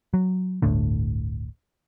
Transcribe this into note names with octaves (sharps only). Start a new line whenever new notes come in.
F#3
G1 D2 A2 D3